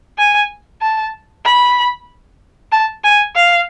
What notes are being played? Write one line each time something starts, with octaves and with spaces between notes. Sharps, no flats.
G#5
A5
B5
A5
G#5
F5